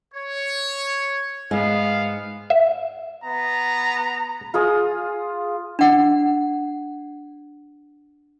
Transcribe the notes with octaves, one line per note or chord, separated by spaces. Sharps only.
C#5
G#2 B3 D#5 F5 G#5
E5
B3 A#5
F4 G#4 D#6
D4 F#5